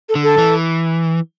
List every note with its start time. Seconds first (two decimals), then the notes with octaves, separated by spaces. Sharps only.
0.09 A4
0.15 D3
0.23 A4
0.38 E3